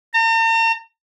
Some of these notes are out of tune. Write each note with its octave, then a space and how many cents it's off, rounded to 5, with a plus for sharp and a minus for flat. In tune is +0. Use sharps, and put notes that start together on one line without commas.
A#5 -45